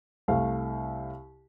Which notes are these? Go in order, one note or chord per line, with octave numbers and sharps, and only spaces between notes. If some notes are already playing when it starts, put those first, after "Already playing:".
C2 A3 F5